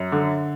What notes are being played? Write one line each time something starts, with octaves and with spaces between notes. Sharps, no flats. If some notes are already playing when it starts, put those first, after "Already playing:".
Already playing: F#2
D3